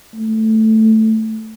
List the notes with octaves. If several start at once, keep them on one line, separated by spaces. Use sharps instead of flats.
A3